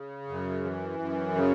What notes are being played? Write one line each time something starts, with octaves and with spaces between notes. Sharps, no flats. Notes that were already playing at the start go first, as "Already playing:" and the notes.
Already playing: C#3
F#2
E3
F#2
C#3